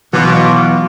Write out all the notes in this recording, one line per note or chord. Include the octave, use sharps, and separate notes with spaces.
B2 E3 F#3 F4 D6